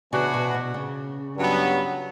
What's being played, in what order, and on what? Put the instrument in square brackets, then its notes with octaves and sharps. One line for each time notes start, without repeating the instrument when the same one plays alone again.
[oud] C#3 [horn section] E3 B3 D4 F#4
[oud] B2
B2
C#3
[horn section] G2 F#3 B3